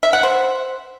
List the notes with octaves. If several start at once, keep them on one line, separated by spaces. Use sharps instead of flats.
E5
F#5
C5